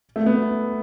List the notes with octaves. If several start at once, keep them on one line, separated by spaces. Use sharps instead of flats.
A3
B3